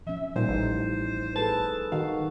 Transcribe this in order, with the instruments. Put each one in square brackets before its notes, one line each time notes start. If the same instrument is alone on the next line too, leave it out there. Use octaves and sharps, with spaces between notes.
[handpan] F3 C#4 [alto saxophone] E5
[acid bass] A#2 [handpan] G3 D#4 F4 [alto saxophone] C5
[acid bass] A1
[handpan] G#4 A4 B4 [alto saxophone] A5
[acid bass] D#3 [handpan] F#4 [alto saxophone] F5